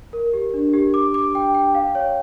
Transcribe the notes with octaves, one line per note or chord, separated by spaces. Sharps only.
A#4
G4
D4
G4
D6
D6
G5
G5
F5
C#5